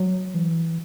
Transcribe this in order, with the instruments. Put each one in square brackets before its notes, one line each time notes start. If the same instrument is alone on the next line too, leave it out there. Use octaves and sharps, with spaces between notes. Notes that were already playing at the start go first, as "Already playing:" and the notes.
Already playing: [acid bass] F#3
E3